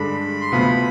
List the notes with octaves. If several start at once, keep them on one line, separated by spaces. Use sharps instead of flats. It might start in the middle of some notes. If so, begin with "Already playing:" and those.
Already playing: G2 D3 G#3 D4 B5
C6
D2 C3 F3 B3 F4 B5